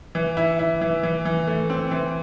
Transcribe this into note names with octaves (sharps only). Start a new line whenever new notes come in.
E3
E4
E4
E3
E3
E3
A3
C4
E3